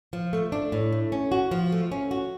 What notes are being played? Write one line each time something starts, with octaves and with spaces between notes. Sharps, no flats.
F3
A3
D4
A2
A3
C#4
F#4
F3
A3
C#4
F#4